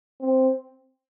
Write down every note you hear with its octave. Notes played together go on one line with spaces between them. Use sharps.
C4